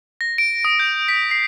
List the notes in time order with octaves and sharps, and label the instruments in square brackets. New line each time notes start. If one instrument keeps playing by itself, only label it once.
[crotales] A#6
D7
D#6
G6
B6
C7